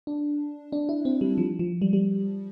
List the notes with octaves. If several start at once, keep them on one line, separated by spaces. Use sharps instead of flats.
D4
D4
E4
C4
G3
F3
F3
G3
G3